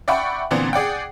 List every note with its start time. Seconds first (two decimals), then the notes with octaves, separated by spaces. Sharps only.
0.08 D5 E5 F#5 G5 B5 C#6
0.51 A#2 D3 E3 B3 C4 D4
0.73 G#4 D5 F#5 G5